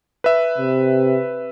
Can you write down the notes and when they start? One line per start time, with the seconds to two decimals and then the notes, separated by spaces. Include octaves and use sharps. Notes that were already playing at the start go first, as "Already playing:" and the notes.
0.24 B4 E5
0.58 C3